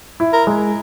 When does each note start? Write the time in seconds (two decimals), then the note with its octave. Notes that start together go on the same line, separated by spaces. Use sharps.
0.20 E4
0.33 A#4
0.47 G#3